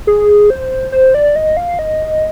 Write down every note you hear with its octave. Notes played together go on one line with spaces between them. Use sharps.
G#4
C5
C5
D5
D#5
F5
D#5